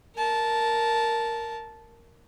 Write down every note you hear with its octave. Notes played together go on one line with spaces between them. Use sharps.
A#4 A5